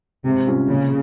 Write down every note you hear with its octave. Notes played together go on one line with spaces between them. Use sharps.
G#2 C3
G3 C#4 F4
A#2 C#3